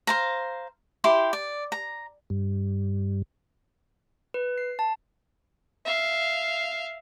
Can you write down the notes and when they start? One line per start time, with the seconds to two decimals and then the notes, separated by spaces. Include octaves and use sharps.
0.07 C5 F5 A#5
1.04 E4 G4 C6 D6
1.33 D5
1.72 A#5
2.30 G2
4.34 B4
4.58 C7
4.79 A5
5.85 E5 F5